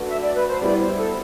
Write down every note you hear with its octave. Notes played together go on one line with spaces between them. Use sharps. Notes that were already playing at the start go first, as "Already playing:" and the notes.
Already playing: A3 D4 F#4 B4
E5
D5
B4
C5
G3 B3 E4 D5
C5
A4